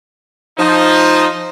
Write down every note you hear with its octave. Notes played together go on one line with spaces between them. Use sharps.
F3 D#4